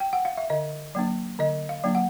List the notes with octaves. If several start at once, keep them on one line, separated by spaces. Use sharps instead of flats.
G5
F#5
F5
E5
D3 D#5
F#3 A#3 D4
D3 D#5
F5
F#3 A#3 D4
F#5